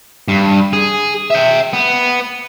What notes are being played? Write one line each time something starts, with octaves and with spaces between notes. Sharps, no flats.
G2
G#4
E5 G5
B3